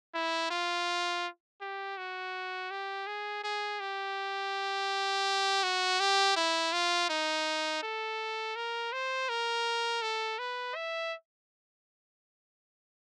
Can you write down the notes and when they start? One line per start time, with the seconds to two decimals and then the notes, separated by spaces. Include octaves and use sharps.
0.15 E4
0.51 F4
1.61 G4
1.98 F#4
2.71 G4
3.07 G#4
3.44 G#4
3.80 G4
5.64 F#4
6.00 G4
6.36 E4
6.73 F4
7.10 D#4
7.83 A4
8.56 A#4
8.93 C5
9.29 A#4
10.02 A4
10.39 B4
10.76 E5